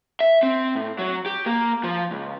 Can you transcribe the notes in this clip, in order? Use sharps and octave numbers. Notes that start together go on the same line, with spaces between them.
E5
C4
A2
F#3
G4
A#3
F3
C#2